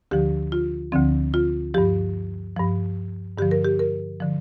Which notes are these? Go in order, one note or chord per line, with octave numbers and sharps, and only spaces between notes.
D2 D3 F3 G4
F4
D2 D3 F3 C4
F4
G2 F3 G4
G2 F3
G2 D3 F3 G4
A#4
G4
A#4
D3 F3